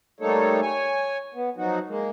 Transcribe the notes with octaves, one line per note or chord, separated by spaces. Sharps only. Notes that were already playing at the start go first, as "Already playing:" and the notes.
G3 A3 A#3 D#4 A4 C#5
C#5 G#5
B3
F3 F#3 D#4 F#4
G#3 A#3